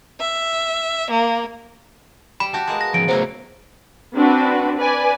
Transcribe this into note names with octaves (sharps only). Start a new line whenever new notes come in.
E5
A#3
G3 B5
F#4 G4 A5
G#3 A#3 B3
A#6
G#2 C#3 F3 D7
A2 F#3 A#3 B3 E4 C5
C4 D4 F#4 B4
B4 D5 G#5